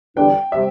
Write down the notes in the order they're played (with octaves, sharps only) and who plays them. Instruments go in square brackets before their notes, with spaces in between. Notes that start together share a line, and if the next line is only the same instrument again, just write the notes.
[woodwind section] E2 D3 G3 D4 [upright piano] G5
[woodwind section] C3 G3 [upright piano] E5